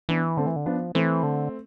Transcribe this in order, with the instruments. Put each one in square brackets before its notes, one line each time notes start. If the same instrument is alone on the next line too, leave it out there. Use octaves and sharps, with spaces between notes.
[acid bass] E3 [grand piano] B3 D4
[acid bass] D3 [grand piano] A3 C4
[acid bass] E3
D3
[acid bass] F3 [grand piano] B3 D4
[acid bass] E3 [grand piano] A3 C4
[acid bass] D3